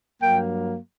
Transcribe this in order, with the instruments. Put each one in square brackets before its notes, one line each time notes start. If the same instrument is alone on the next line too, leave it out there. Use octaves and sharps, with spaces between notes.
[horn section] G2 F#3 A#3 G5